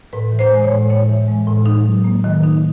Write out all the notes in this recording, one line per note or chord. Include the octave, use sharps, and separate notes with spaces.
A2 B4
E3
C5
G#3
C#5
A2
A2 C#5
E3
G#3
A2
D#4
F#3
A#3
D#3
D#4